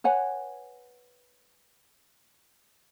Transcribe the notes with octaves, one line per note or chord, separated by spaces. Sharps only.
B4 C#5 F#5 G#5